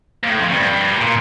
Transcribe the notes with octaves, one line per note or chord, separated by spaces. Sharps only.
A#2
A2
F2
G2
A#2